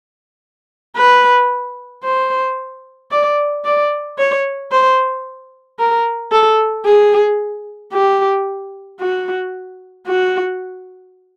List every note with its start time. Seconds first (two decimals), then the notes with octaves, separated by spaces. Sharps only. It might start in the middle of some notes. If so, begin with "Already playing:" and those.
0.96 B4
2.04 C5
3.11 D5
3.65 D5
4.19 C#5
4.71 C5
5.79 A#4
6.32 A4
6.85 G#4
7.93 G4
9.00 F#4
10.07 F#4